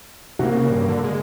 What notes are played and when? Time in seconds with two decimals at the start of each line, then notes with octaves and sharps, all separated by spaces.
0.39 C3 A#3 F#4
0.56 C#3
0.70 G2
0.88 D3
1.04 G#3